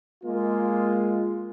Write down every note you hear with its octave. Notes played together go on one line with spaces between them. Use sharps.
G#3 A#3 F4